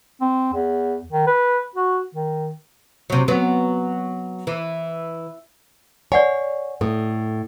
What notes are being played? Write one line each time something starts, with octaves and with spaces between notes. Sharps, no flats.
C4
E2
D#3
B4
F#4
D#3
C3 F#3
F#3 B3
E3
C#5 D5 F#5 G#5
A2 A4